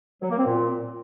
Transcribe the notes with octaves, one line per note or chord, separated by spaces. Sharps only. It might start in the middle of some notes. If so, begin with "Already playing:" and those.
F#3
A#3
C4
A#2